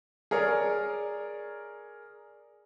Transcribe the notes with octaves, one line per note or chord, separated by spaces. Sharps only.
G#4 A#4 C#5 D5